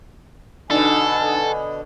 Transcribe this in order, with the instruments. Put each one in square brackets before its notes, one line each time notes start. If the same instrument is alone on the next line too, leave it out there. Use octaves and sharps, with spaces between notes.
[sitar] B2 D3 [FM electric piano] D4 D#4 [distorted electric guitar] A4 [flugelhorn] G#5